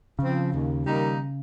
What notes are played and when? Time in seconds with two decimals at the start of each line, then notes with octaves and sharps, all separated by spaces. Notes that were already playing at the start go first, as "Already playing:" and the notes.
0.19 C#3 F3 C4
0.52 D#2
0.86 D#3 G3 A#3 D#4